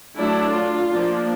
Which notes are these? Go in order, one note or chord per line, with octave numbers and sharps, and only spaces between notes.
F#3 A3 D4 E4
F4
F3 A#3 D4